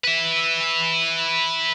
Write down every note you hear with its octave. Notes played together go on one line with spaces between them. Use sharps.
B4 E5